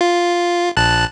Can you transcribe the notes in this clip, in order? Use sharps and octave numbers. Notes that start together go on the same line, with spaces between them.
F4
A#1 A5 F#6